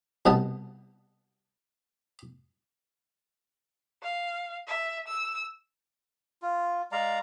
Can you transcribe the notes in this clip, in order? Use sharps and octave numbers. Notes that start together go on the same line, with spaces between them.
C2 B2 D#5 A5
F5
E5
E6
F4
G#3 D5 F5 A#5